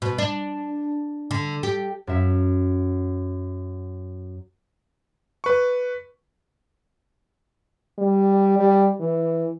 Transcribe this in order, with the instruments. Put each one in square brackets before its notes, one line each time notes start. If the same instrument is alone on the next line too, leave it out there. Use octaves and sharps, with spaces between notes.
[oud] B2
D4
D3
G4
[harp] F#2 E5
[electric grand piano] B4 C#6
[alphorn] G3
G3
E3